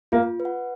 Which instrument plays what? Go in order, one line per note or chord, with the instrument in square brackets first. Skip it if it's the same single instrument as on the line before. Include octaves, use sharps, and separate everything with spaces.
[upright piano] A#3 [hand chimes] F4
[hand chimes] B4
F#5